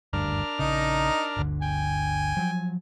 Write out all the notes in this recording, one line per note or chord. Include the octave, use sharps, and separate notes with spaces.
F#1 D2 G2 D4 A#4 F6
A#1 C#3 D#4
G1 D2 D3
G5 G#5
F3 F#3